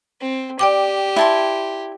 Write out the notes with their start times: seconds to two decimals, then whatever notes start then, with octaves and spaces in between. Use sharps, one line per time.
0.21 C4
0.59 G4 D5 G5 D6
1.16 E4 A5 C6